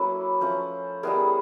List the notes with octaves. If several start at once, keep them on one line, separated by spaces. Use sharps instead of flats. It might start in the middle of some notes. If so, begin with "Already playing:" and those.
Already playing: F#3 A#3 C#4 E4 A4 B4
F3 A3 C#4
G3 B3 E4 G#4 A#4